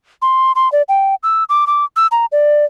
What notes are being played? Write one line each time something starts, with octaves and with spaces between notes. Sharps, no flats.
C6
C6
D5
G5
E6
D6
D6
E6
A#5
D5